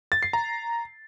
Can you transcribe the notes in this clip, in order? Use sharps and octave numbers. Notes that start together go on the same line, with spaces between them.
A6
C7
A#5